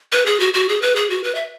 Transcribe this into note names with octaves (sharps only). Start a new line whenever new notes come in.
B4
G#4
F#4
F#4
G#4
B4
G#4
F#4
B4
E5